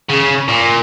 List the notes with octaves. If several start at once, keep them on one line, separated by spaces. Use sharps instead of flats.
C#3
A#2